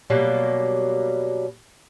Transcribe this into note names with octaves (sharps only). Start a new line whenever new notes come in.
B2 F#3 G3 A#3